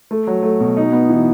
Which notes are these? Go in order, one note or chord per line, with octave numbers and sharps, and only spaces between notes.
A3
F#3
A3
B2
D#4
B3
E3